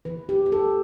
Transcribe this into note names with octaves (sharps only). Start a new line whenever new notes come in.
E3 B3 B4
G4
G4
A4